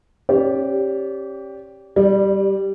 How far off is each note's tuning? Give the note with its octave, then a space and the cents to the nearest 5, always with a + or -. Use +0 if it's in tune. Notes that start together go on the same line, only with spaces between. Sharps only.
C#4 -35 G4 +0 D5 -35
G3 -5 D5 +30